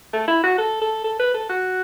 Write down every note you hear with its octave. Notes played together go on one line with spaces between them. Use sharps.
A3
E4
F#4
A4
A4
A4
B4
A4
F#4